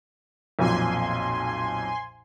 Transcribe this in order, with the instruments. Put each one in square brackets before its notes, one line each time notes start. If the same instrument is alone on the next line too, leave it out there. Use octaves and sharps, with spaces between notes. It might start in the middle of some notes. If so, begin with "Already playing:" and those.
[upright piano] B1 F2 A#2 [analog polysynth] G#5 C6